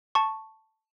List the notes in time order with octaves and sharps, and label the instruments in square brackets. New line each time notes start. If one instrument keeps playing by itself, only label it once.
[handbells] A5 C#6